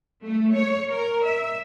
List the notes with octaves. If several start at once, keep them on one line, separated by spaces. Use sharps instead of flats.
A3
C#5
A#4
E5